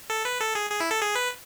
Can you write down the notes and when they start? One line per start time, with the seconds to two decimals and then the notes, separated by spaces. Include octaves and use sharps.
0.10 A4
0.25 B4
0.40 A4
0.55 G#4
0.70 G#4
0.80 E4
0.91 A4
1.01 G#4
1.15 B4